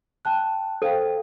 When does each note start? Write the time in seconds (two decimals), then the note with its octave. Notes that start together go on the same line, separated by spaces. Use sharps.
0.25 G5 A5 F#6
0.82 A4 C5 F5 G5